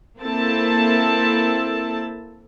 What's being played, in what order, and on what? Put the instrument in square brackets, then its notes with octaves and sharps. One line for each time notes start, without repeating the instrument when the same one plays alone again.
[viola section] A#3 C4 E4 A4 A5